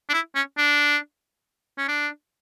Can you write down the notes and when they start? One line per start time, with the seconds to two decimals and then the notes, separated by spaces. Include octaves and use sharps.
0.09 D4
0.13 E4
0.35 C#4
0.58 D4
1.78 C#4
1.88 D4